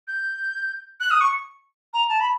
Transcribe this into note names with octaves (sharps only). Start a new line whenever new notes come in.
G6
F#6
D#6
C#6
A#5
A5
B5